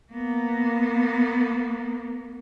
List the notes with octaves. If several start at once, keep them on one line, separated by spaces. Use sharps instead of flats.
A#3 B3